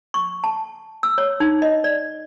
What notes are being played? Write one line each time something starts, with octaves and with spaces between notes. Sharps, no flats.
C#6
A5
E6
C#5
D#4
D#5
D5